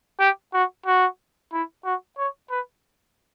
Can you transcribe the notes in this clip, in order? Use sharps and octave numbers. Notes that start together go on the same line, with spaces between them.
G4
F#4
F#4
E4
F#4
C#5
B4